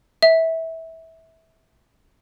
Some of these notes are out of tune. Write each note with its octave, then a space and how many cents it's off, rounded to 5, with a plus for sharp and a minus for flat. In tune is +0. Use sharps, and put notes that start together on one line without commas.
E5 -20